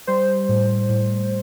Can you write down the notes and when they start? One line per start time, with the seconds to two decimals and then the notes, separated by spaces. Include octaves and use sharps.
0.07 G3 C5
0.49 A2
0.89 A2